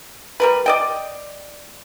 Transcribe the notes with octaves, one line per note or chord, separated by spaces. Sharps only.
G3 A#4 B4
D5 D#5 G5